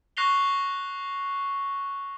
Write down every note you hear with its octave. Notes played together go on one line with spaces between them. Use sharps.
C#6 F#6 A#6 C7 F7 G7